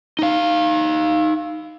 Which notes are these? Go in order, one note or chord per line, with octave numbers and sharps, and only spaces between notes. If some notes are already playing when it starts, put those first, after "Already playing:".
D#4 F5